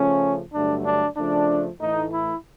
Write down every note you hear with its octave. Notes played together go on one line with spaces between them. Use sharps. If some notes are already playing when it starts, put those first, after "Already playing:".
Already playing: C#3 F3 A3 C#4
G2 D3 F#3 A3 D4
D4
C#3 F3 A3 D4
A2 E3 A3 D#4
E4